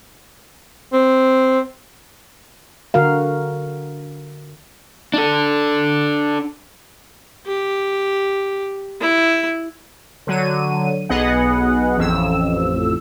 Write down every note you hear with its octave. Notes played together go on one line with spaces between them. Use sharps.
C4
D3 F#4 A#4 F5
D4 A4
G4
E4
D3 F#3 D#7
B1 B3 G#4 D#5 F#5
A1 F2 E6